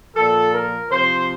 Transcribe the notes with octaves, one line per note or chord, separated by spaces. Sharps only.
A#2 F3 A4
A#4
C3 F3 C5